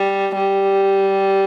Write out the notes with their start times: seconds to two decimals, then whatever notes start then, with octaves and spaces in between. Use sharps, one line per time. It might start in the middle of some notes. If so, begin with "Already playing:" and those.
Already playing: G3
0.35 G3